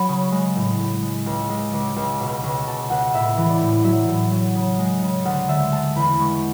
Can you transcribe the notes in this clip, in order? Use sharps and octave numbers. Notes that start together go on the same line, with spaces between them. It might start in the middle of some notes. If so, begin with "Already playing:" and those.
Already playing: F#3 B5
C#3 C#6
G#3 C#6
A2
A2
G#3
C#2
G#3
C#2 D6
C#2
B2
C#2 C#6
B2 A5
C#2 F#5
A2 E5
E3
D5
A2
F#3 E5
A2
F#3
C#3
G#3
C#3
D2 F#5
D3 E5
G#3 A5
E2 B5
G#3 C#6